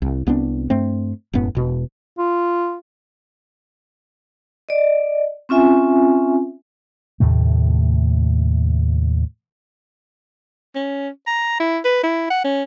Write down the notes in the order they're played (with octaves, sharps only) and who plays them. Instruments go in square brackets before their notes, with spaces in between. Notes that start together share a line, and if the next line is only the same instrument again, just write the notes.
[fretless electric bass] C2
C2 B3 C4 D4
G2 A3 C4
E1 F#2 A2 B3
E1 B2
[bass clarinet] F4
[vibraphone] D5 D#5
C4 C#4 F4 E5 G#5
[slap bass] D#2 A2 C3 A3
[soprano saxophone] C#4
A#5
E4
B4
E4
F#5
C#4